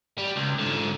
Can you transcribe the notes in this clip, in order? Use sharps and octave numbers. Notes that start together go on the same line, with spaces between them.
G3
C#2
G#2 D3